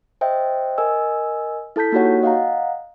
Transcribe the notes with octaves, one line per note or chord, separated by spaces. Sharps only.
C5 D#5 E5 G5
A#4 D#5 G#5 E6
E4 A4 A5 G6 B6
A#3 D#4 F#4 G4 C#5 F#5
D#5 F5 F#5 A#5